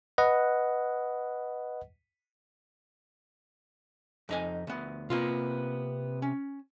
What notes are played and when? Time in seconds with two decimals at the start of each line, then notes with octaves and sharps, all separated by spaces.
0.18 B4 D#5 F#5
4.29 F2 D#4 G#5
4.67 D2 B3
5.10 C3 A#3 B3 F4
6.22 C#4